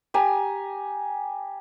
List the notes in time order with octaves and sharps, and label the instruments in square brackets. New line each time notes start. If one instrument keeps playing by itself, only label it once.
[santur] G4 G#5 A#5